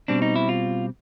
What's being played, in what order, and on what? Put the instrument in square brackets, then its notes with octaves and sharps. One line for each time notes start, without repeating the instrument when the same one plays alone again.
[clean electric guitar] B2 G3 C4 D4
D#4
E4
F4